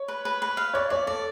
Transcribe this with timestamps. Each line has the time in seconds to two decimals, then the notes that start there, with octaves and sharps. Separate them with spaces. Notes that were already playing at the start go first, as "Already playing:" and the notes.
Already playing: C#5
0.08 B4
0.25 B4
0.42 B4
0.57 F5
0.74 C#5 D5
0.90 C#5 D5
1.07 A4 D5